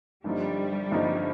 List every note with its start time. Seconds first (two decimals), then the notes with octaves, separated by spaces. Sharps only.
0.24 G1 G2 F3 G3 A#3 D#4
0.91 G1 G2 F3 A#3 D#4